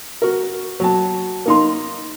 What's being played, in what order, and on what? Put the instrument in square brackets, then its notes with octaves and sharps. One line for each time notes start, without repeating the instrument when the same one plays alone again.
[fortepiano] F#4 A#4
F#3 A5
A#3 D#4 C6